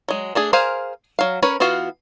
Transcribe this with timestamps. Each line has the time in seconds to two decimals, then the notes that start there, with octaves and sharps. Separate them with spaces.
0.08 F#3 G#3
0.35 A3 D4 G#4
0.53 G#4 A#4 C5 F5 G#5
1.19 F#3 F5
1.42 C#4 A#4 B4 C#5
1.60 E3 B3 F4 F#4 F5